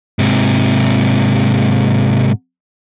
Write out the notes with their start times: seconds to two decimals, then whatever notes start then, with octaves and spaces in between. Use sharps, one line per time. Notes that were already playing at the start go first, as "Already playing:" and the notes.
0.19 G#2 C3